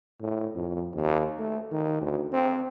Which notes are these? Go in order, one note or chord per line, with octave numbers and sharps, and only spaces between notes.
A2
F2
D#2
A3
D#3
D2
C4